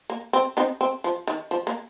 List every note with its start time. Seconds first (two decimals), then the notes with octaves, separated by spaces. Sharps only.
0.10 A#3
0.33 C4
0.57 C4 D#4
0.81 C4
1.04 F3
1.27 D#3
1.51 F3
1.67 A#3